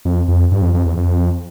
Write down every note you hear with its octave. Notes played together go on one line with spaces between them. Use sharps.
F2
F2
G2
F2
F2
E2
F2